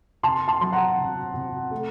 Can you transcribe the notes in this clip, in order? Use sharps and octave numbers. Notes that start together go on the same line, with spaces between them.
C3 A5 C6
A5 C6
F#3 C6
F#5 A#5
C3
C3
A3